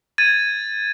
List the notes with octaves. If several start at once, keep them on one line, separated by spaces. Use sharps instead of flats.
G#6 A6 D#7